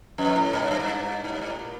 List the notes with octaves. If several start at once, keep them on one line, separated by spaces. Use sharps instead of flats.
F2
A2
G#2
G2
F#2
G2
G#2
G2
G#2
A2
A#2